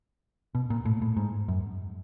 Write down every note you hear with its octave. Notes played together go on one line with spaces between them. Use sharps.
B2
A#2
A2
A2
G#2
F#2